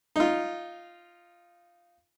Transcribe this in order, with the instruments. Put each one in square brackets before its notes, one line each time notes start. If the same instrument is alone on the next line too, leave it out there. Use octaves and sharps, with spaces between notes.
[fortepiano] D#4 F4